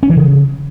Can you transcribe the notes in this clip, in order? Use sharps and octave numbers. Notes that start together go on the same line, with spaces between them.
C#4
E3
C#3